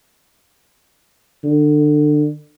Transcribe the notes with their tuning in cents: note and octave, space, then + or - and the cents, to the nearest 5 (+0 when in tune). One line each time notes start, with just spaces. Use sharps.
D3 +25